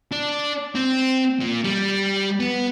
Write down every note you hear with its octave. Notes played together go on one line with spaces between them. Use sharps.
D4
C4
A#2
G3
B3